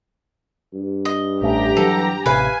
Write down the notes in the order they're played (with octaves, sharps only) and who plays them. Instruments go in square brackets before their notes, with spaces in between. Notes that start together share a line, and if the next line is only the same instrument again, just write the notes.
[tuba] G2
[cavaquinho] D#5
[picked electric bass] A1 A3 C#4 [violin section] G4 A#5
[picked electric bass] E3 F#3 [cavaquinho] A4
[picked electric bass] A1 C3 [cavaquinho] B4 F5 [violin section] G#5